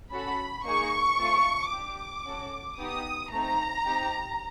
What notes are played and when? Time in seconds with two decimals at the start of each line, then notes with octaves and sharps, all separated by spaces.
0.12 C#4 F#4 A4 B5
0.65 A#3 D#4 G#4 C#6
1.19 A3 C4 F4 A4
1.72 D4 G4 D6
2.25 C#4 F#4 A4
2.78 B3 D#4 G4 D#6
3.31 A3 C4 D#4 A#5
3.85 C4 D#4 G4